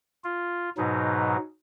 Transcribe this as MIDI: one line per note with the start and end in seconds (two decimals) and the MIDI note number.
0.24 0.70 65
0.77 1.37 44
0.77 1.37 47
0.77 1.37 54
0.77 1.37 63